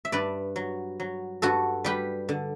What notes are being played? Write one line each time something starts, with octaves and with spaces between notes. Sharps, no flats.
E5
G2 B4 D5
F#3
F#3
G2 F#4 A4
G3 G4 B4
D3